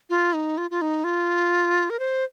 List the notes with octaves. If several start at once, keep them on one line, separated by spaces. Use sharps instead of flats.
F4
D#4
F4
F4
D#4
F4
A#4
C5